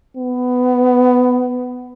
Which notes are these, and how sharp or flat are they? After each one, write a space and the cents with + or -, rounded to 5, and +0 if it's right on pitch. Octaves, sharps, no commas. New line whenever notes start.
B3 +15